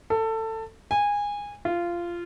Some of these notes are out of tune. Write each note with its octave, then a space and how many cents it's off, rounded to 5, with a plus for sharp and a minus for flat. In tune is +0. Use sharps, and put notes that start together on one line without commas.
A4 +20
G#5 -20
F4 -15